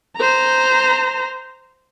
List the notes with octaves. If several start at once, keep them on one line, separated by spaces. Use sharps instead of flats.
C5 A#5